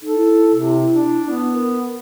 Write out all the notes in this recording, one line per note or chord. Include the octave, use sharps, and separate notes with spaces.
D#4 A4
E4
C3
D4
B3
A#4